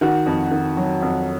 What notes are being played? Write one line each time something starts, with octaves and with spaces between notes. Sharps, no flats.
D#3 F#4
F2
D#3
F#3
F2